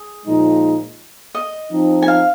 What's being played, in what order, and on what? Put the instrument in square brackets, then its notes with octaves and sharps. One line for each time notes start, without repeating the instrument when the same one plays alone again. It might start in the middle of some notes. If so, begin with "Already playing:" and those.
Already playing: [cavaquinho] G#4
[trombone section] A#2 F3 G#3 D#4
[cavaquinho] D#5
[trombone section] F3 C4 D#4
[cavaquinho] G#5
F5